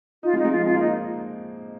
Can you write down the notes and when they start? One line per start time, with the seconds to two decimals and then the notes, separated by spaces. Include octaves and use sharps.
0.23 D#4 F4
0.33 G#3
0.37 D#4
0.45 G#3
0.51 F3 F4
0.65 G#3 F4
0.75 A#3 D#4